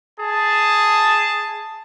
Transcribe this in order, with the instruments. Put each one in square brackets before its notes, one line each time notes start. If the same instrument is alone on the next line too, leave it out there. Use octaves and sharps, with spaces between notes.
[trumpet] G#4 [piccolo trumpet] A5